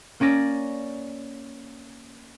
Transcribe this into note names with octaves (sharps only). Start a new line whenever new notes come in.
A#3 C#4 D5 A#6